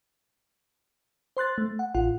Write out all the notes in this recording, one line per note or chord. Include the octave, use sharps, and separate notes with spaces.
C5 C6 F#6 A6
A3
F#5
A1 F4 F#5